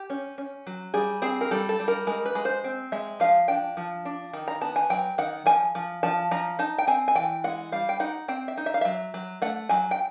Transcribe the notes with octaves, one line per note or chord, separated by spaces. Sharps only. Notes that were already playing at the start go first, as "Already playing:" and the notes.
Already playing: G4
C#4
C#4
F#3
G3 G#4
C4 G#4
A#4
G3 A4
A4
G3
A#4
G#3 A#4
B4
G#3
C5
C4
G#3 E5
F3 F5
D4 G5
F3
D4
D#3
A#5
B3 A5
G#5
F#3 G5
D#3 F#5
F3 G#5
F3
F3 A5
F3 A#5
D#4 A5
G5
C4 G#5
G#5
E3 G5
G#3 F#5
G3 F5
G5
D#4 F#5
C4 G5
E5
D#4
E5
F5
F#3 E5
F#3
A3 F#5
F#3 G#5
G5